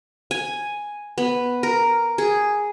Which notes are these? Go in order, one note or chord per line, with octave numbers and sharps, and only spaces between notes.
G#5
B3
A#4
G#4